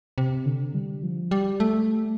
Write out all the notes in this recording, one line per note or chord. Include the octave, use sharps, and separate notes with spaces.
C3
D3
G3
F3
G3
A3